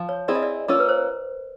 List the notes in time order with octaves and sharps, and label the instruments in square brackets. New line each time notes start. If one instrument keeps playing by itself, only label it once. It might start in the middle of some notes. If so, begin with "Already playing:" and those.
Already playing: [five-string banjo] F3
[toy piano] C#5
[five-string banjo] C4 E4 G#4 [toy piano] D5
[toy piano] D#5
D5
[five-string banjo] A#3 C#4 F4 [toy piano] A#4
[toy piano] B4
C5